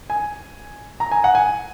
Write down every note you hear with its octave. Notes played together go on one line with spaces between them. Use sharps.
G#5
A#5
G#5
F#5
G#5